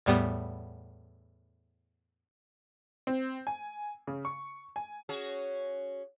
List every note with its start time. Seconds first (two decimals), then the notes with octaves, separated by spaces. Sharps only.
0.06 E2 A2 G3 B3
3.07 C4
3.47 G#5
4.07 C#3
4.25 C#6
4.76 G#5
5.09 C#4 F#4 G#4